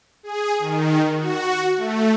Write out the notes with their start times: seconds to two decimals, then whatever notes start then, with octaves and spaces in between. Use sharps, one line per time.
0.23 G#4
0.59 D#3
1.16 F#4
1.77 A3